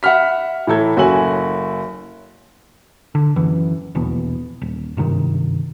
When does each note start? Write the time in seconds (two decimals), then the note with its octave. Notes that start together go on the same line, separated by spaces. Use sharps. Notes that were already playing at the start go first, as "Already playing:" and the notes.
0.03 E5 F#5 B5 F6 B6
0.67 A2 E3 E4 A4 A#5 G#6
0.96 F#1 C#4 F#4 A4 G#5 F#7
3.15 D3
3.36 F#2 E3
3.95 D#1 A#1 E2 B2
4.62 D#1
4.97 F#1 G2 C3 D#3